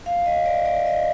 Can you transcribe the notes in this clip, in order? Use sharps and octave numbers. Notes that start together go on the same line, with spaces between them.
F5
D#5
D5
D5
D#5